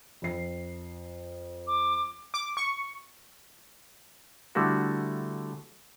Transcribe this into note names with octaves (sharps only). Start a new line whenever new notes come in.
F2 C7
D6
D6
C#6
D3 G3 A3 E4 F#4